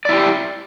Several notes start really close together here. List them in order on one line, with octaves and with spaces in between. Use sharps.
D5 E4 G4